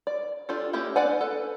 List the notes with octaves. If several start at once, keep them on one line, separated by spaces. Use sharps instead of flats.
D5
D4 F4 G4 A4
A3 A#3 C#4 E4 G4
D4 B4 D5 F#5 G#5
A4 B4